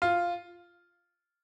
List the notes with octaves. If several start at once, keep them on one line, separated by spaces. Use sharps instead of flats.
F4